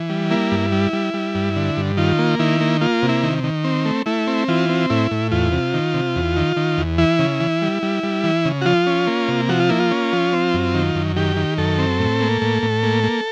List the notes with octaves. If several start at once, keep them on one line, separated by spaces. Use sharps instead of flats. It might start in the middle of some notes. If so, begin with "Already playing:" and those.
Already playing: E3
G3
A#3 E4
G2
G3
G3
G3
G2
D3
G2
D#3 F4
A#3
D#3 E4
A#3
A#3 F4
C3
E4
D#3
D#3
C4
A3
A3 E4
C4
E3 F4
C4
A2 E4
A2
E2 F4
C3
D#3
C3
E2
D#3
D#3
E2
E3 E4
C#3
E3
G3
G3
G3
E3
C#3
F#4
F3 F4
C#4
A#3
C3
F3 F#4
F4
A#3 E4
F4
C#4
F3
C4
F#2
D#3
F#2
D#3 G4
D#3
F#2 A4
C4
A2
A#3
A2
A2
A#3
A#3